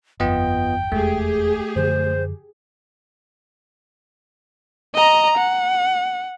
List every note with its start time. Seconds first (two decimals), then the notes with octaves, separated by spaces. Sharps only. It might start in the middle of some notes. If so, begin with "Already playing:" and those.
0.20 G1 F2 B3 F4 D#5 G5
0.92 F1 E2 G#3 A3 G4 G#4
1.76 F#2 D3 F3 C5
4.95 D#5 A#5
5.38 F#5